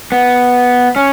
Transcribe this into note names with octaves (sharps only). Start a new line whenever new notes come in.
B3
C#4